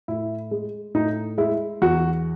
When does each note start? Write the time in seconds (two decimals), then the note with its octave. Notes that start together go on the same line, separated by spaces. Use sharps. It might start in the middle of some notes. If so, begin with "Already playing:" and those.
0.08 A2 E4
0.51 G#3
0.94 A2 D#4
1.38 G#3 E4
1.82 E2 F#4